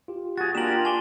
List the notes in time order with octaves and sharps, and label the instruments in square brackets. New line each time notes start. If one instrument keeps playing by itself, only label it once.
[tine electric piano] F4 G4
[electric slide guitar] F#4 G#4 [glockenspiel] A6
[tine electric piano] A#3 [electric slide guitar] D4 G4 A#4 [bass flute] F4 [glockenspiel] E7 F#7
[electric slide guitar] D4 [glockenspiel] G#5 G7 [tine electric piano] C#6 D6